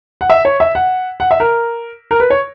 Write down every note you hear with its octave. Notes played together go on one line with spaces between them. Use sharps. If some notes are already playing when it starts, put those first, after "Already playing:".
F#5
E5
C#5
E5
F#5
F#5
E5
A#4
A#4
B4
C#5